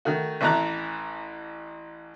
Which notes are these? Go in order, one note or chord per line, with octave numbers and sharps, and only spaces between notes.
D#3 A3 F#4
A1 E3 E5 A5 A#5 F#6